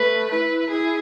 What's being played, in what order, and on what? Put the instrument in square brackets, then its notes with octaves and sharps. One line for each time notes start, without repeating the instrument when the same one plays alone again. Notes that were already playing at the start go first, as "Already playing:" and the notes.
Already playing: [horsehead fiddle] A3 [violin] B4
[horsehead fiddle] E4 [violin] B4
[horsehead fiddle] E4 [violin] G#4